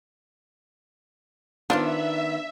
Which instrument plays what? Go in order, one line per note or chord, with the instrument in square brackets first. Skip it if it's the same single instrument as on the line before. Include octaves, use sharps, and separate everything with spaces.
[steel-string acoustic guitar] D#3 B3 [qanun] D4 [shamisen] F4 C5 F5 [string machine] E5